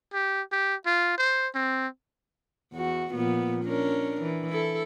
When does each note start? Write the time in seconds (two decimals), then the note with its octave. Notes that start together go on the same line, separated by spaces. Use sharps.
0.14 G4
0.52 G4
0.86 F4
1.18 C5
1.55 C4
2.73 E2 F#4
3.14 A#2 F3 B3
3.65 C#4 D4 A#4
4.21 E3
4.50 E4 A4